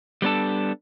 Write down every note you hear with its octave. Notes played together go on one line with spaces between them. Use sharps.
G3 B3 D4 A4